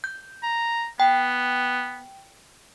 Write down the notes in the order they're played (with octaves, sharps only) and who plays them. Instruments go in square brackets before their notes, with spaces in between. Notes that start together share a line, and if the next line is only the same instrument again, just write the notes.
[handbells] G6
[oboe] A#5
[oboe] B3 [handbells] G5